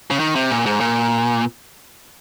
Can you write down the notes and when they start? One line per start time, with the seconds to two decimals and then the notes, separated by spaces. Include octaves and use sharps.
0.11 C#3
0.20 D#3
0.36 C3
0.51 A#2
0.66 G#2
0.81 A#2